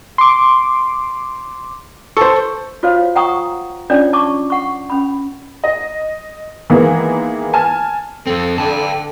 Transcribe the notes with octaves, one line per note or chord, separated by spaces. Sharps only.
C6 D6
A4 C5 C#6
F4 F#4 C5 C#5 F5
F#5 G5 A#5 C#6 D#6
C#4 D4 F4 C#5 D5 G5
A5 C#6 D6
F#5 C#6
C#4 B5
D#5
D#3 E3 G#3 A#3 B3
G#5 A5 F6
F2 C4 A4
D3 G5 A5